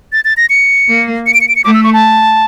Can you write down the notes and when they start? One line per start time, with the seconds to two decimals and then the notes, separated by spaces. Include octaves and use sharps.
0.13 A6
0.25 A6
0.37 A#6
0.50 C#7
0.88 A#3
1.26 C#7
1.34 D7
1.41 C#7
1.48 D7
1.56 C#7
1.64 A3 D6
1.74 E6
1.84 C#6
1.93 A5